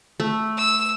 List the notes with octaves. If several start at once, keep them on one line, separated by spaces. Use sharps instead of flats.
A3
E6